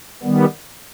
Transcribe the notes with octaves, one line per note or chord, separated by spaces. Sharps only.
D#3 G3 B3